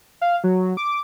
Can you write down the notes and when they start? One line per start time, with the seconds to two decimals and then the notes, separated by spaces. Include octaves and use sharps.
0.21 F5
0.44 F#3
0.77 D6